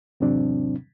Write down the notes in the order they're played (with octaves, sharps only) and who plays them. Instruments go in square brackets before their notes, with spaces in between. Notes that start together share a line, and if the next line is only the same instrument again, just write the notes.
[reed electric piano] E2 G#2 C3 F#3 C4 D4